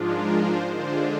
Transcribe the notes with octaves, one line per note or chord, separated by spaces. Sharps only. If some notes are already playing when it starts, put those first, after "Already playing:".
Already playing: G#2 F3 G#3 D4 F4
A#4
C5
D3 G#3 D4 F4 C5